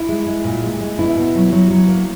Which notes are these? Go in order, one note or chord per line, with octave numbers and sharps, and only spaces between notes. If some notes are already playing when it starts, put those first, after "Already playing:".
Already playing: E4
G#3
G#3
A#2
G#3
G#3
B2 E4
B2
F#3
F#3
F#3
A#3